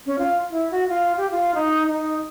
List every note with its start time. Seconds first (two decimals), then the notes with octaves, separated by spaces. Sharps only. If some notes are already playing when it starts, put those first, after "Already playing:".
0.06 C#4
0.19 F4
0.51 E4
0.71 F#4
0.88 F4
1.17 G4
1.31 F4
1.55 D#4
1.87 D#4